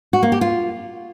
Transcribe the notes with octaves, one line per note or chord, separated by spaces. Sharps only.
F#4
A#3
G4
F4